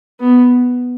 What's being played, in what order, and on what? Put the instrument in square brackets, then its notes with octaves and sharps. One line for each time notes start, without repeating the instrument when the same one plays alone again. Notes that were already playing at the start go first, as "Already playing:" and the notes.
[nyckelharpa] B3